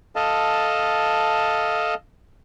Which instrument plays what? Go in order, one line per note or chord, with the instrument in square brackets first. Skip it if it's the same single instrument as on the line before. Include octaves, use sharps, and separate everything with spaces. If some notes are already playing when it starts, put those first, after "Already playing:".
[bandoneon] A4 D#5 F5 A5